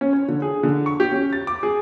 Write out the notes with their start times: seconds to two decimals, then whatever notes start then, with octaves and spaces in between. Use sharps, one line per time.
0.01 C#4
0.13 C#5
0.28 D3
0.42 G#4
0.63 D3
0.86 C#6
1.00 G4
1.12 C#4
1.33 A6
1.47 D6
1.63 G#4